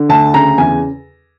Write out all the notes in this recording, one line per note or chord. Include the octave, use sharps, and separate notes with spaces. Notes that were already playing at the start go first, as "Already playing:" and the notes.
Already playing: D3
D2 A5
C#3 A#5
E2 G#5